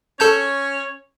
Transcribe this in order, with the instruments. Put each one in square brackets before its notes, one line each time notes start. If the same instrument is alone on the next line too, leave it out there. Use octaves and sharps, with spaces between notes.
[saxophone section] C#4 C#5 [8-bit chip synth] A4 A5 G6